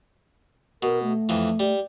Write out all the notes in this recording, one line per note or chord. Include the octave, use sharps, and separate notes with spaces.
B2 A#4
A3
F2 E3
G3